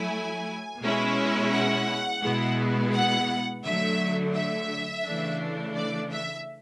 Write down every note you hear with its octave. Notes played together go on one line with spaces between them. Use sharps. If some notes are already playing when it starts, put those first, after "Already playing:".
Already playing: F#3 A3 E4 G#5
B2 G#3 C#4 E4
F#5
B2 G#3 B3 E4
F#5
D3 F#3 A3 E5
E5
C#3 E3 A3 D4
D5
E5